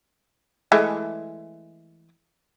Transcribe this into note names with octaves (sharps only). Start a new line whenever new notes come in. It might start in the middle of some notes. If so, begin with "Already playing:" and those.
E3 G#3 A3